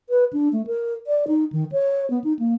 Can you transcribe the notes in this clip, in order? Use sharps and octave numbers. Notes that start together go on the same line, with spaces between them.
B4
D4
A3
A#4
D5
D#4
D#3
C#5
B3
D#4
A#3